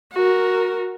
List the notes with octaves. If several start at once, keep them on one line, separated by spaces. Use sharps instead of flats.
F#4 A#4